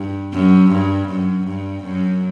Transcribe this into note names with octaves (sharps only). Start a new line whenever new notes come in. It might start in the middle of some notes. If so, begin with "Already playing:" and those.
Already playing: G2
F#2
G2
F#2
G2
F#2